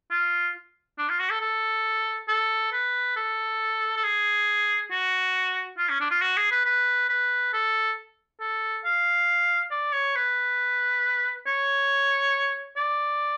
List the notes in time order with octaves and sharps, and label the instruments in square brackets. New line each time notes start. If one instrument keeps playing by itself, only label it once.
[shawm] F4
D4
F4
F#4
A4
A4
A4
B4
A4
A4
G#4
F#4
F4
C#4
D4
F4
F#4
G#4
B4
B4
B4
A4
A4
F5
D5
C#5
B4
C#5
D5